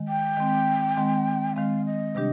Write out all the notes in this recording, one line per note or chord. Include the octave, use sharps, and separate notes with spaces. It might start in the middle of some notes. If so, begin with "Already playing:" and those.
Already playing: D#3 G#3
G5
D#3 G#3 C4
D#3 G#3 C4
D#3 G#3 C4 F5
D#5
C3 G3 D4 G4